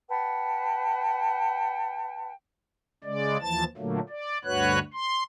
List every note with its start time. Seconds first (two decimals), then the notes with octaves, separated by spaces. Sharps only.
0.09 B4 F#5 G5 A5
3.04 C#3 G#3 D5
3.41 D#2 E3 F3 A5 A6
3.77 A#2 D3 F#3 A3 A#3
4.09 D5
4.45 D2 G2 F#4 B4 C#5 F#6
4.94 C6